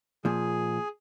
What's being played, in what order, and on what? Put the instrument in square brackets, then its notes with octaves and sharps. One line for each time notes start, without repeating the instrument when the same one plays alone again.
[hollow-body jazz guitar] A#2 F3 [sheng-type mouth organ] G#4